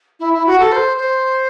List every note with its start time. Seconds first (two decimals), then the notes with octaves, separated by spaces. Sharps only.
0.19 E4
0.33 E4
0.46 F#4
0.59 A4
0.72 C5
0.97 C5